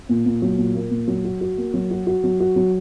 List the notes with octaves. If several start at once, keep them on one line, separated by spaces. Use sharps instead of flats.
A#2
A#2
F#3
A#2
A#3
A#2
F#3
F#4
F#4
A#3
F#3
F#4
F#4
F#3
F#4
F#3